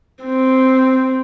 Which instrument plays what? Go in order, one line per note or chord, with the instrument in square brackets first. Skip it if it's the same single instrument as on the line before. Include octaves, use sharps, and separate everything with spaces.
[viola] C4